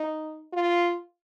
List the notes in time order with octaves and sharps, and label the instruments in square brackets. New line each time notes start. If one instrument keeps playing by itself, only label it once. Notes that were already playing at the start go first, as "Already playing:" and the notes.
Already playing: [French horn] D#4
F4